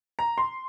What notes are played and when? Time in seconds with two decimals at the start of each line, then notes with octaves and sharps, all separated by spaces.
0.19 A#5
0.38 C6